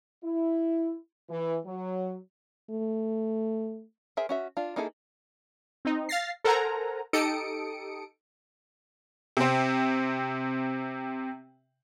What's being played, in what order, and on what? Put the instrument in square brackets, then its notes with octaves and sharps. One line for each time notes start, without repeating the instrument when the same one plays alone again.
[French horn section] E4
E3
F#3
[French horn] A3
[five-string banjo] G#4 A#4 C5 E5
C#4 F#4 E5
D4 F4
A#3 D#4 E4 G#4 A4
[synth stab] C4 D#4
F5 A6 A#6 C7
A4 A#4 C5 F#5 G#5 A#5
D#4 G4 A4 D#6 C#7 D7
[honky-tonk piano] C3 C4